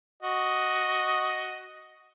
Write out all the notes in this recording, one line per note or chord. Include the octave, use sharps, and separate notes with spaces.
F#4 D#5